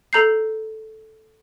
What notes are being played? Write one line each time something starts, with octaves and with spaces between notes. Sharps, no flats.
A4 A#5 G6 C7